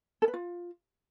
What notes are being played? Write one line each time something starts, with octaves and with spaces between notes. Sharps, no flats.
A4
B4
F4